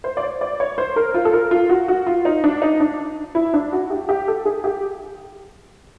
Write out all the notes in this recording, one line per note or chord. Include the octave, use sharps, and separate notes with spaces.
C5
D5
C#5
D5
C#5
C5
A#4
F4
A4
A#4
F4
F#4
F#4
F4
D#4
D4
D#4
D4
E4
D4
F#4
G4
G4
A4
G#4
G4